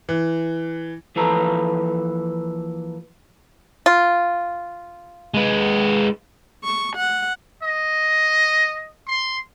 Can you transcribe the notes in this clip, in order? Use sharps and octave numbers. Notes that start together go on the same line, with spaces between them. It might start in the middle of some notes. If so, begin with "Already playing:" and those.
E3
E3 F3 A#3 A4 B4 A#5
F4
G#3 B4
C#6
F#5
D#5
C6